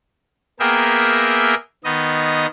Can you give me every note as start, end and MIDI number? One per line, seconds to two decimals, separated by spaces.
0.60 1.55 58
0.60 1.55 59
0.60 1.55 68
0.60 1.55 70
0.60 1.55 76
0.60 1.55 79
1.84 2.46 51
1.84 2.46 59
1.84 2.46 63
1.84 2.46 75